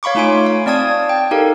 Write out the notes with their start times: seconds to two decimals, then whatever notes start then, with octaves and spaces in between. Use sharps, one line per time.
0.03 C#5 F5 B5 C#6 D6
0.15 A3 D#4 F4 G#5 C6 D7
0.46 F5
0.66 C4 D5 A5 D#6 G#6
1.09 G5
1.31 D#4 G4 A4 A#4 F5